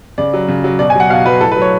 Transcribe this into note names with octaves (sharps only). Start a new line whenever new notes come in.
C#3 D5
F#3
C#3
F#3
B2 D5
G#5
F#3 F#5
B2 F5
F#3 B4
A2 A4
B4
F#3
C#5